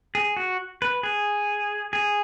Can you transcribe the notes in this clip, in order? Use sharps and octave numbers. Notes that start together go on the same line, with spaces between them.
G#4
F#4
B4
G#4
G#4